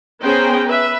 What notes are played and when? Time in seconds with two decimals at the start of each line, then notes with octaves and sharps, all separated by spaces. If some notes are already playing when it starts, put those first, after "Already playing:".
0.22 B3 C#4 G#4 C5 G5 A#5
0.66 B4 E5